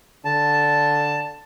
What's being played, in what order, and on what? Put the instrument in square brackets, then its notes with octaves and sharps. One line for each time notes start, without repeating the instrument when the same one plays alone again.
[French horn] D3 [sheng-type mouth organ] A5